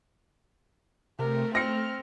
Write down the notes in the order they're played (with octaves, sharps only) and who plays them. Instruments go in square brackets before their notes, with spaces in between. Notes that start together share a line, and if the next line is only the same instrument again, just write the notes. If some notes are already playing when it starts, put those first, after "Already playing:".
[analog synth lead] C3 [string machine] A3 [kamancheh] A#4
[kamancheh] C4 [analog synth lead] F6 [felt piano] A#6 C#7